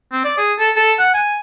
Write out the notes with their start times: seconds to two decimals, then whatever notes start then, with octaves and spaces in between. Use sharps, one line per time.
0.12 C4
0.25 D5
0.38 G#4
0.59 A4
0.77 A4
0.99 F#5
1.14 G#5